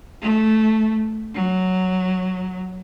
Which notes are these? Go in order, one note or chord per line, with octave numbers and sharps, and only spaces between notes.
A3
F#3